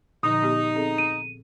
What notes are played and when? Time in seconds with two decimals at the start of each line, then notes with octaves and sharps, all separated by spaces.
0.23 A#2 D3 F3 D#4 D#6
0.42 A#2 B3 G4
0.76 C4 G#4 A4
0.98 D#7